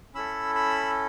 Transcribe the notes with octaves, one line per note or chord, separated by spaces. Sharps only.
C#4 E4 A4 B5 E6
B5 E6